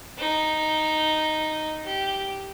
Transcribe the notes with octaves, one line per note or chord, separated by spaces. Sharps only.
D#4
G4